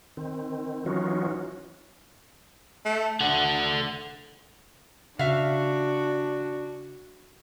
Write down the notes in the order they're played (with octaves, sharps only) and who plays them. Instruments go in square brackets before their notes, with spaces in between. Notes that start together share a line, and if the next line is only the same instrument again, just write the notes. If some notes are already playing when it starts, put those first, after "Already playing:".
[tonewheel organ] D#3 C4
E3 F#3 C#4 D#4 F4 F#4
[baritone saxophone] A3
[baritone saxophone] D2 [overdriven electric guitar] A4 F#5
[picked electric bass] C#3 [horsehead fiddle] D4 [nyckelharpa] F#4 [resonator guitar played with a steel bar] E5 F5